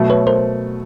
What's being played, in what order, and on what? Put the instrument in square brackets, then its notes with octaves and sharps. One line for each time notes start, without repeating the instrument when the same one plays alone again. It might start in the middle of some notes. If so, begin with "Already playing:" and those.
Already playing: [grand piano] B2 F#3 A3
[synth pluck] B4 C#5
A#4 C5